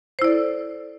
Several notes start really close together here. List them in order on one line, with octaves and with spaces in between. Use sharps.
C5 E4 D5 A4